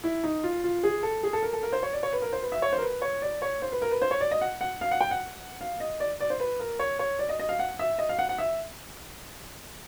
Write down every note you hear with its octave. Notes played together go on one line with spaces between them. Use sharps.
E4
D#4
F4
F4
G#4
A4
G#4
A4
A#4
A4
A#4
C5
C#5
D5
C#5
B4
A#4
C5
B4
E5
C#5
C5
A#4
B4
C#5
D5
C#5
C5
B4
A#4
B4
C5
C#5
D5
D#5
F#5
F#5
F5
F#5
G5
F#5
F5
D#5
D5
D5
C5
B4
A#4
C#5
C#5
D5
D#5
D#5
F5
F#5
E5
D#5
F5
F#5
F#5
E5